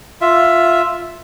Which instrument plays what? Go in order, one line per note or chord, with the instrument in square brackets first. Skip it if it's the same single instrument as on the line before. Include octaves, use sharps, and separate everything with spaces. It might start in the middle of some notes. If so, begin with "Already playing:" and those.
[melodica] F4 E5